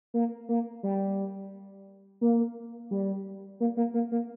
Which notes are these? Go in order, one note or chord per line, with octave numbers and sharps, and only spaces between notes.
A#3
A#3
G3
A#3
G3
A#3
A#3
A#3
A#3